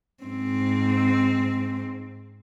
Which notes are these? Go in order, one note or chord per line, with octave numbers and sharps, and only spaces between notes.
G#2 C4